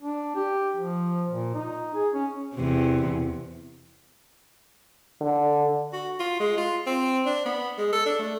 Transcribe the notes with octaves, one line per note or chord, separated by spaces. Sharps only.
D4
G4
F3
A#2
D#4
G#4
C#4
E2 C3
D3
F#4
F4
G#3
F4
C4
D4
B3
G#3
A4
D4
A3